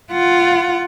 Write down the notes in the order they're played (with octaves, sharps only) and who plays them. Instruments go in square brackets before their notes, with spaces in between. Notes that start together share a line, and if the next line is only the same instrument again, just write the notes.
[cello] F4 F#5